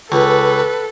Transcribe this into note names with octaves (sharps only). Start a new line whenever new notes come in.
C#2 A4 B4